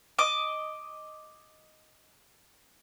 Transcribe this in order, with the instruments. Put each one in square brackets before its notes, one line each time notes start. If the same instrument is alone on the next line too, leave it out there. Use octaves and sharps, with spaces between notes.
[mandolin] D#5 D6